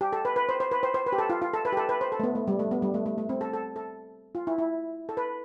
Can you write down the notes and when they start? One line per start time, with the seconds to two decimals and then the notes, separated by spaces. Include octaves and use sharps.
0.01 G4
0.13 A4
0.25 B4
0.36 B4
0.49 C5
0.60 C5
0.71 B4
0.83 C5
0.94 C5
1.06 B4
1.12 G4
1.18 A4
1.30 F4
1.42 F4
1.54 A4
1.65 B4
1.72 G4
1.77 A4
1.89 B4
2.01 C5
2.12 A4
2.20 A3
2.23 B3
2.35 A3
2.48 G3
2.59 A3
2.71 B3
2.82 G3
2.94 A3
3.06 A3
3.18 A3
3.29 C4
3.41 A4
3.53 A4
3.76 A4
4.35 F4
4.47 E4
4.58 E4
5.09 A4
5.17 B4